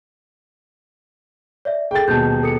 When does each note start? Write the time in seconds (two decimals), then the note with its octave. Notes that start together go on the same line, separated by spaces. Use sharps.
1.65 C#5 D5 E5
1.91 G#4 A4 G5 A6
2.08 D#1 B2 G#3 A5 G6
2.43 A4 D#6 C#7